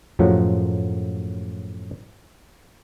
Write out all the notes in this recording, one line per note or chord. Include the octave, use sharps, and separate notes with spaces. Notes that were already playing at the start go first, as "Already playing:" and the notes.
F#2 A2 F3 F#3 G#3 F#4